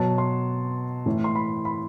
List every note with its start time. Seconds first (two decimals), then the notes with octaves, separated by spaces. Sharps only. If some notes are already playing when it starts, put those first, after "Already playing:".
Already playing: B2 F#3 A5
0.18 C6
1.06 A2 E3
1.24 C6
1.35 B5
1.65 B5